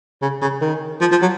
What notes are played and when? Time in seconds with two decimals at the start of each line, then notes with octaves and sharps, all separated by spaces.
0.22 C#3
0.41 C#3
0.61 D#3
1.01 F3
1.11 F3
1.21 F#3